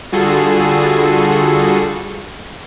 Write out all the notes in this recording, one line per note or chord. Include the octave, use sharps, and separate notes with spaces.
D3 G3 F4 F#4 G#4 A4